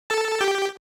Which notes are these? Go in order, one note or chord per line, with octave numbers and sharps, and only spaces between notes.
A4 A5
G4 G5